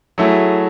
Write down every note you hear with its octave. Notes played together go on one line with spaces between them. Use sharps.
F#3 A3 E4 G#4